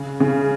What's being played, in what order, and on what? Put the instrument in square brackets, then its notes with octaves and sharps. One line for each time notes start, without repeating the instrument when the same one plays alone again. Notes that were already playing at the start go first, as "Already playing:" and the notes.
Already playing: [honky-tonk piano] C#3
C#3